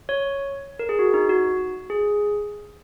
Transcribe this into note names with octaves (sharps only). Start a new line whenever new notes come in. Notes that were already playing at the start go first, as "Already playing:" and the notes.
C#5
A#4
G#4
F#4
D#4
F#4
G#4